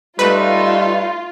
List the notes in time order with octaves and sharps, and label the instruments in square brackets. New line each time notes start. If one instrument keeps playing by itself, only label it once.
[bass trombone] G3 [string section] A3 D#4 [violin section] F4 [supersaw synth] B4